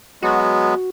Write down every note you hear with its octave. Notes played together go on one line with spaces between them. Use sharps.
F#3 G#3 B3 F#4